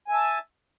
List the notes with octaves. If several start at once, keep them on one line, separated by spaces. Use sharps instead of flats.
E5 G#5 A5